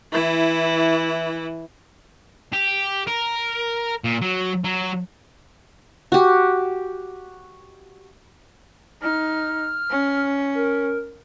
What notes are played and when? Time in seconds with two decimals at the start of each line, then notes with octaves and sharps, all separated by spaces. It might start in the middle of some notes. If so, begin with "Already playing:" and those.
0.12 E3 E4
2.53 G4
3.07 A#4
4.04 A#2
4.22 F#3
4.64 F#3
6.12 F#4 G4
9.02 D#4 F6
9.90 C#4
10.55 A#4